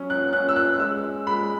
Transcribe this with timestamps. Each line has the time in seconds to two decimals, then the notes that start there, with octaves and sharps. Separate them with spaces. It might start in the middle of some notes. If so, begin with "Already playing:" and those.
Already playing: F#3 C#4
0.10 F#6
0.33 C#4 F#6
0.49 E6
0.56 F#6
0.79 G#3 E6
1.27 G#3 B5